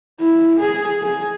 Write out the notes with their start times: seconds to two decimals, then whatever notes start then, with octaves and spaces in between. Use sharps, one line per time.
0.20 E4
0.60 G#4
1.02 G#4